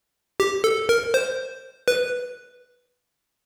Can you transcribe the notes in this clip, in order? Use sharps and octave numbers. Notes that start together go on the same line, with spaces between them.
G4
A4
A#4
C5
B4